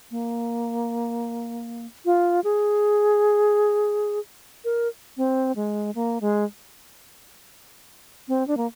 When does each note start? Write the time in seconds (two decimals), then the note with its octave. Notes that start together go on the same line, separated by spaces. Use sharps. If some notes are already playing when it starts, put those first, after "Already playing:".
0.11 A#3
2.05 F4
2.44 G#4
4.65 A#4
5.17 C4
5.56 G#3
5.95 A#3
6.21 G#3
8.28 C4
8.48 D4
8.57 A#3